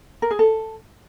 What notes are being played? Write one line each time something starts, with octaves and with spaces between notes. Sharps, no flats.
A#4
G#4
A4